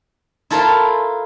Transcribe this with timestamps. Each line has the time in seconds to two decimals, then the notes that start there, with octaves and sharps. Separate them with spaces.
0.50 E4 F4 A4 A#4 C5 F5